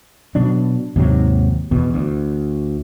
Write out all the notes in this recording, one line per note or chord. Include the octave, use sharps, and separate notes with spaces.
B2 F#3 D4
D#2 G#2 C3 F#3
E2 B2
D2